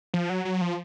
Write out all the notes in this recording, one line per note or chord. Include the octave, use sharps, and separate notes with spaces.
F3
F#3
F#3
F3